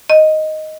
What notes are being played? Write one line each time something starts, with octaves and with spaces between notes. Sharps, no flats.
D#5